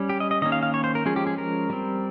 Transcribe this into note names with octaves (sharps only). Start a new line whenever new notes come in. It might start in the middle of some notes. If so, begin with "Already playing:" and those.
Already playing: G3 C#4
G4
D#5
D#5
D#3 A#3 C#4 D#5
F5
F5
C#5
C5
A#4
F3 G#3 C#4 G#4
G4
G#4
A#4
G3 C4